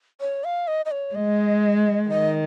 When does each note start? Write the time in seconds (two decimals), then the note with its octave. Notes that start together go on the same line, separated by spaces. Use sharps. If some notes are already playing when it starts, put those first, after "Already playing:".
0.21 C#5
0.44 F5
0.68 D#5
0.85 D#5
0.91 C#5
1.15 G#3 D#5
2.08 D#3 D#5